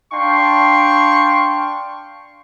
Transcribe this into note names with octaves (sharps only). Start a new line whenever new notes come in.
D4 F5 G5 C6 C#6